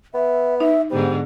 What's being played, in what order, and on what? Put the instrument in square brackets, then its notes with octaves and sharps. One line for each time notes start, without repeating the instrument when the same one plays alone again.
[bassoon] B3 [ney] E5
[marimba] D#4 [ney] E5
[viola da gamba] G#2 D3 B3 [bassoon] G3 [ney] C5